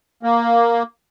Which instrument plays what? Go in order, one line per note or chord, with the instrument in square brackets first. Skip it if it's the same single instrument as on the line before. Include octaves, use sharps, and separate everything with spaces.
[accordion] A#3